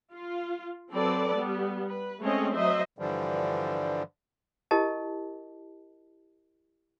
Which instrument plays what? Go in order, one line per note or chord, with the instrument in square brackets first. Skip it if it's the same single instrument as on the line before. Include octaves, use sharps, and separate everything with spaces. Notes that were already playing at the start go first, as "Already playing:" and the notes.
[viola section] F4
F#3 C4 A4 B4 D5
G3 B3
B4
G#3 A3 C4 C#4 C#5 D#5
F#3 C5 D#5 E5
[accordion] G2 D3 E3 F3 G3
[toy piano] E4 G4 A#4 D#5 A5